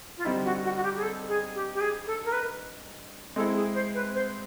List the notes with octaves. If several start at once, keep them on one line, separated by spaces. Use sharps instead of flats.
F4
D3 G3 C4 D#4 E4
F#4
F#4
F#4
G4
G#4
A4
G#4
G4
G4
G#4
A4
A#4
B4
G#3 C4 E4 A4
G#4
C5
B4
C5